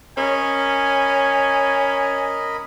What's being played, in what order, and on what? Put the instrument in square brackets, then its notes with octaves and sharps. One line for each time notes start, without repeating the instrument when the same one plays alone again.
[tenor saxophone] C#4 [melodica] A#4 D#5 B5 [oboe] G#5